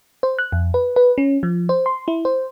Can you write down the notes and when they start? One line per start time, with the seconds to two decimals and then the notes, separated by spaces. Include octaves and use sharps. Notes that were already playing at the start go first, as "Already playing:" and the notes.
0.23 C5
0.39 F#6
0.52 F2
0.74 B4
0.96 B4
1.18 C#4
1.43 F3
1.69 C5
1.86 C6
2.08 E4
2.25 C5